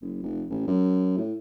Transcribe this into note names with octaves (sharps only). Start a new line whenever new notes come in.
F#1
F1
A1
F#2
A2